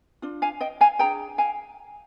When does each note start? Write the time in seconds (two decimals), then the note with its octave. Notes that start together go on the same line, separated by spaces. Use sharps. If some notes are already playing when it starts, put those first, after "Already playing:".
0.22 D4 F4
0.42 F5 G#5
0.61 D#5 G5
0.81 F5 G#5
0.99 D4 F4 G#4 G5 A#5
1.38 F5 G#5